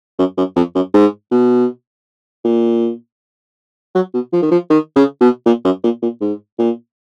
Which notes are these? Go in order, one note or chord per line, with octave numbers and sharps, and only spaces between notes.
F#2
F#2
F2
F#2
G#2
B2
A#2
F#3
B2
F3
D#3
F3
D#3
C#3
B2
A#2
F#2
A#2
A#2
G#2
A#2